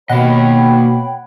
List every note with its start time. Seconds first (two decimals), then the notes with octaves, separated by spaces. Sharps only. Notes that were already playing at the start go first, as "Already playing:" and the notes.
0.10 B2 A#3 C#5 D#5 F#5 G5 B5